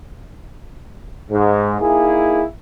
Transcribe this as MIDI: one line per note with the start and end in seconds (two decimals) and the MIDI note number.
1.31 1.75 44
1.80 2.43 58
1.80 2.43 63
1.80 2.43 64
1.80 2.43 68